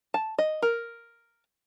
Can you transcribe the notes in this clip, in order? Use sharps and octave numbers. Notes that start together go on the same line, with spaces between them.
A5
D#5
A#4